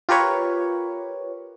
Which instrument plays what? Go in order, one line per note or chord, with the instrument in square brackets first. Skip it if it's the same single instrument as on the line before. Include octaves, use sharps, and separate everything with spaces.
[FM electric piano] F4 G4 A#4 B4 C#5